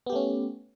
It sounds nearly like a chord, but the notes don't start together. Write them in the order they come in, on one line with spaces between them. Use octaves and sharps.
B3 G4 A3 C#4